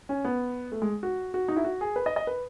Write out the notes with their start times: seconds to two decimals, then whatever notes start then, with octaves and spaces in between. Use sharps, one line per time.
0.09 C#4
0.25 B3
0.72 A3
0.82 G#3
1.03 F#4
1.34 F#4
1.48 D#4
1.56 E4
1.64 F#4
1.81 G#4
1.96 B4
2.06 D#5
2.16 D#5
2.27 B4